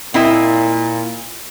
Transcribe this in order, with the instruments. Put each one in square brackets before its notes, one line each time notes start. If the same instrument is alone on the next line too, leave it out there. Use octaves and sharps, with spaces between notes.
[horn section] A#2 [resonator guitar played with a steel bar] C4 E4 D#5